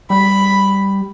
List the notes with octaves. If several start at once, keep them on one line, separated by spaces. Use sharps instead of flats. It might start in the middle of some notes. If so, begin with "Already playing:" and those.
G3 B5